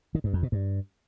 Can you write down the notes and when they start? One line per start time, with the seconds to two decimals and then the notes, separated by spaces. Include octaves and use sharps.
0.15 D#3
0.24 G2
0.33 F2
0.43 B2
0.52 G2